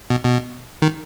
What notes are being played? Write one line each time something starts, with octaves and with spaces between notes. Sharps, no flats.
B2
B2
D#3